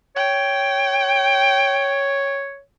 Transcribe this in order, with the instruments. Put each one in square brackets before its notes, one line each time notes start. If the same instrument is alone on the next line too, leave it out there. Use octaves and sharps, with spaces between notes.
[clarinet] C#5 [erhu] G5